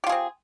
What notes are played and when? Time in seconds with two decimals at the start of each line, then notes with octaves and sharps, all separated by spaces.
0.04 G4
0.06 F4
0.09 G#4
0.12 C4